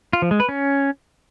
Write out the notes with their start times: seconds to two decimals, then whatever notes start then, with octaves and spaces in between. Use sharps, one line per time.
0.13 F4
0.22 F3
0.31 G#3
0.40 B4
0.49 C#4